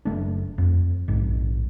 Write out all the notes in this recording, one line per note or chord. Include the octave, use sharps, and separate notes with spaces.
F#1 A3 D4
F2
A#1 G#2